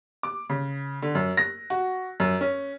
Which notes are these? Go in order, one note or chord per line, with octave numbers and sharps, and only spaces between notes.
D6
C#3
D3
F#2
A#6
F#4
F#2
C#4